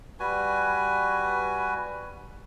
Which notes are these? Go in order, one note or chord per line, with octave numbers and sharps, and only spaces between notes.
G3 F#4 B4 G#5